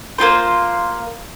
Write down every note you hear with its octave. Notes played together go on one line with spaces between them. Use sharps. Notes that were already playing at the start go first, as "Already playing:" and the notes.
A#3 C4 F4 C5